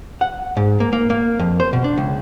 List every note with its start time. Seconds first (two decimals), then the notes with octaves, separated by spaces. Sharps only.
0.21 F#5
0.57 G#2
0.80 A#3
0.93 A#3
1.10 A#3
1.39 F2
1.60 C5
1.73 B2
1.84 D4
1.98 C#2